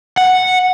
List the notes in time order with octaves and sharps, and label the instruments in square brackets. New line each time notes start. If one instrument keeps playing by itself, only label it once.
[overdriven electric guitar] F#5